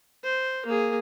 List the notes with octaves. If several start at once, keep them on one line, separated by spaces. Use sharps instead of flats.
C5
A#3 G#4